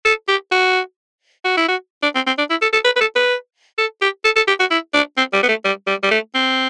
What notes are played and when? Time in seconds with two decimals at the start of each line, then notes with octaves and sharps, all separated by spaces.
0.05 A4
0.28 G4
0.52 F#4
1.44 F#4
1.57 E4
1.68 F#4
2.02 D4
2.15 C4
2.27 C4
2.38 D4
2.50 E4
2.62 A4
2.73 A4
2.84 B4
2.96 B4
3.00 A4
3.16 B4
3.78 A4
4.01 G4
4.24 A4
4.36 A4
4.47 G4
4.60 F#4
4.71 E4
4.94 D4
5.18 C4
5.33 G3
5.43 B3
5.48 A3
5.64 G3
5.87 G3
6.03 G3
6.11 A3
6.34 C4